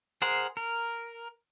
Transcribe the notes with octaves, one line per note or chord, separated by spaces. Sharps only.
G#4 A#4 C5 F#5
A#4